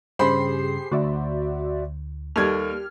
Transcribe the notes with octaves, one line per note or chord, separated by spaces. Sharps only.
G2 C#3 G4 G#4 C5 B5 C6 C7
D2 F#4 D5 E5
D#2 G3 G4 A4 F6 G#6